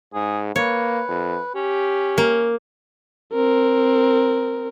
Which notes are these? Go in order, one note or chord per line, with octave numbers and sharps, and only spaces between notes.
G#2 G#4
A#3 B4 C#5
F2
C#4 G4
A#3
C4 A#4